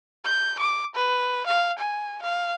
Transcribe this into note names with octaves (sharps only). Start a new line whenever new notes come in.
G6
D6
B4
F5
G#5
F5